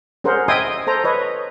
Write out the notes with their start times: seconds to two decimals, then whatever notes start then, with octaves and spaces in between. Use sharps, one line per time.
0.24 C#4 G#4 A#4 C5 F#5
0.48 D#5 E5 G5 G#5 C6 D#6
0.87 A4 C5 A#5
1.04 B4 C#5 D#5